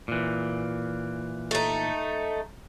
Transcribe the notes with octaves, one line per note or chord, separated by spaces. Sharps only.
A#2 E3
A3 D#4